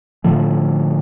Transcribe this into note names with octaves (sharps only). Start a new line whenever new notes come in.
A2 D3 F3 A3